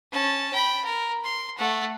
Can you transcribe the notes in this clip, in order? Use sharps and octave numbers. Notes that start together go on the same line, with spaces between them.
C#4 A5
G5 B5
A#4
C6
A3 F#5